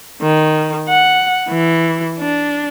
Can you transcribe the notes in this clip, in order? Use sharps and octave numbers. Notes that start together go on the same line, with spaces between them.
D#3
F#5
E3
D4